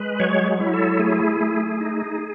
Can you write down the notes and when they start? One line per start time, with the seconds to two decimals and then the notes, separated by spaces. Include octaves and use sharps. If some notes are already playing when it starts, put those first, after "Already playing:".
Already playing: G#3 B4
0.20 F#3 C#5
0.60 E4
0.73 A4
0.99 A3 G#4
1.41 A3
1.81 D#4